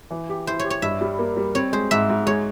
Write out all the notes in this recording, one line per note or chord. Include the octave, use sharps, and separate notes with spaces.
E3
G4
E4 C5
G4 C#5
C#5
G2 E5
G3
A#3
G3
C4 C#5
G#3 C5
G#2 E5
G#2
G#3 C#5